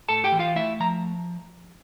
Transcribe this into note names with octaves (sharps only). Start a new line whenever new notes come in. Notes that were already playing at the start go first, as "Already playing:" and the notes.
A2 A4 A5
G4 G5
E3
F4 F5
A3 E4 E5
F3 A#5